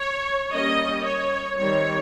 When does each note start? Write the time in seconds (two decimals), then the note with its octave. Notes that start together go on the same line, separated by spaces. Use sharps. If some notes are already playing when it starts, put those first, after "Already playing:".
Already playing: C#5
0.52 G3 A#3 C#4 D#5
1.05 C#5
1.58 D#3 G3 C4 C#5